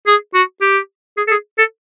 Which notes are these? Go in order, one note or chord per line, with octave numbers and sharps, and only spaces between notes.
G#4
F#4
G4
G#4
A4
G#4
A4